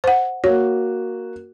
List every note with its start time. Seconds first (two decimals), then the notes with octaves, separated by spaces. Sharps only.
0.04 C5 F#5
0.44 A#3 F#4 C#5